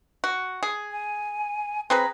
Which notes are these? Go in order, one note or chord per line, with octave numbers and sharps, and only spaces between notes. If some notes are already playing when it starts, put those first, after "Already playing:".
F#4
G#4
G#5
C4 G#4 B4 A#5